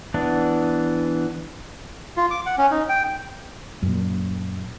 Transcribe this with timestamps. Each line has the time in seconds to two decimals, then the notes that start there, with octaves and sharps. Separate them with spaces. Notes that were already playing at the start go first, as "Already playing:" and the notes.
0.14 E3 B3 D4
2.17 F4
2.30 D6
2.46 F#5
2.58 C#4
2.71 D#4
2.89 G5
3.83 F#2 A#2